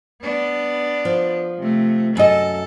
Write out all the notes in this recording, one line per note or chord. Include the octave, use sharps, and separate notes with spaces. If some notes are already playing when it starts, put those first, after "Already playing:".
B3 D4
F3
C3 A3
F#2 A4 D#5